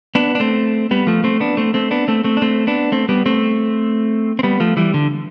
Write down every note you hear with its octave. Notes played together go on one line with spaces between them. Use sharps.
B3 D4
D4
A3 C4
G3 B3
F3 A3
A3 C4
B3 D4
A3 C4
A3 C4
B3 D4
A3 C4
A3 C4
D4
A3 C4
B3 D4
A3 C4
G3 B3
A3 C4
C4
G3 B3
F3 A3
E3 G3
D3